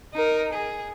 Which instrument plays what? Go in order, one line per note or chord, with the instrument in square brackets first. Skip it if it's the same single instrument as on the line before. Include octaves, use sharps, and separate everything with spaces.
[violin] D#4 A#4
G#4